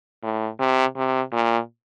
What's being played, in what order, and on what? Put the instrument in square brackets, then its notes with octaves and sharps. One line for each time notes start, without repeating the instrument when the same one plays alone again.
[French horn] A2
C3
C3
A#2